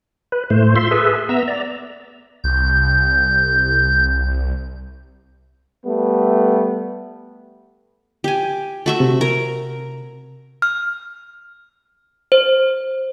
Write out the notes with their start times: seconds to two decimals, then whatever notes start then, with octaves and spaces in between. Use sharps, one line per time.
0.32 B4
0.50 A2 A3 C5
0.76 F4 E5 C6
0.91 G#4 A4 B4 E5
1.29 B3 E5 A#5 E6
1.48 D5 A#5
2.44 C2 G6
5.86 G3 A3 B3
8.24 G4 G#5
8.86 A3 F#4 E5
9.00 C3
9.21 A#4
10.62 F6
12.32 C5